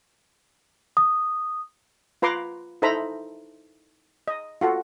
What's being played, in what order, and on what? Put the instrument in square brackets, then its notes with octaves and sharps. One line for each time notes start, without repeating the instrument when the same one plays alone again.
[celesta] D#6
[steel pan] F4 B4 A#5 C6 D6
D#4 E4 A4 C5 A#5 B5
D#5
F4 F#4 A4